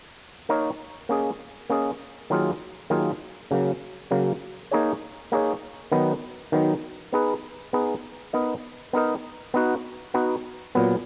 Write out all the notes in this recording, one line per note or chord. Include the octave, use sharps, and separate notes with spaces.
A#3 D#4 A#4 C#5
A#3 C#4 G#4 D#5
A#3 C#4 G#4 D#5
D#3 F#3 A#3 F4 G#4
D#3 F#3 A#3 F4 G#4
C#3 F#3 A#3
C#3 F#3 A#3
A#3 D#4 G#4 C#5
A#3 D#4 G#4 C#5
D#3 F#3 B3 D#4
D#3 F#3 B3 D#4
B3 D#4 G#4 B4
B3 D#4 G#4 B4
B3 D#4 A#4 D#5
B3 D#4 A#4 D#5
B3 D#4 F#4
B3 D#4 F#4
A#2 F#3 B3